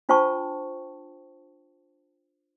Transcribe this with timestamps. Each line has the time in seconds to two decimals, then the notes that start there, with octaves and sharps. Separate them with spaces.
0.09 D4 F4 C5 G5 A5 C#6